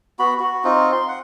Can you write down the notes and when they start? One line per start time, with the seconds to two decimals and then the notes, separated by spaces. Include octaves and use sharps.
0.19 B3 F#4 B5
0.40 F#4
0.64 C4 D#4 F4
0.92 C6
1.08 F#5